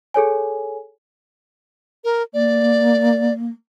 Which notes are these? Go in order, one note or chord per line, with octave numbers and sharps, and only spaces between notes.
G#4 A4 C#5 G#5
A#4
A#3 D5